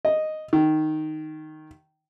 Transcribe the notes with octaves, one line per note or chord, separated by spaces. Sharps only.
D#5
D#3